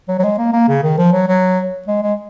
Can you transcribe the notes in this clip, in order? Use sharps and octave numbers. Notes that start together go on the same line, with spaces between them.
F#3
F#3
G#3
A#3
A#3
C#3
D#3
F3
F#3
F#3
G#3
G#3